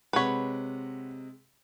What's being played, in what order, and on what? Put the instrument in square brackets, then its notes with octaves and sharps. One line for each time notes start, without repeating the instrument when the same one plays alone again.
[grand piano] C3 G#3 [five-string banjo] B4 C#5 [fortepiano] F#5 B5